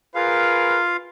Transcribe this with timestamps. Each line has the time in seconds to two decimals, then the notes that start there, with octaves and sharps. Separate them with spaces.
0.15 F4 G#4 A#4 B4 F5